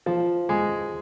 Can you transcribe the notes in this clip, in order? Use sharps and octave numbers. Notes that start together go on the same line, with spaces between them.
F3
G#3